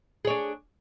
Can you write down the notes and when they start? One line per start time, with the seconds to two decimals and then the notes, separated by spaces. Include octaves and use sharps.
0.25 G#4
0.27 C#5
0.30 D4